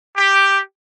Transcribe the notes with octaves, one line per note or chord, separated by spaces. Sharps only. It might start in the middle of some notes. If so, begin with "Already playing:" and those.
G4